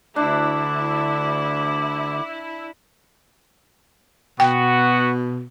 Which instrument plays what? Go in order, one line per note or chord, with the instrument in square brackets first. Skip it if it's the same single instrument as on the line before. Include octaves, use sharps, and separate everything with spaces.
[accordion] D2 [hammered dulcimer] D4 [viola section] E4 [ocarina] D6
[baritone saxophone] B2 [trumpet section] B3 F#4 [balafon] G5